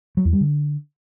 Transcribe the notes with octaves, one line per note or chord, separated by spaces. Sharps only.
F#3
E2
G3
D3